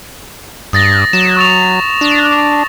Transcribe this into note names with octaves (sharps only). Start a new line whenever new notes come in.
G2 D#6 A6 A#6
F#3 E7
C#6 A6 F7
D4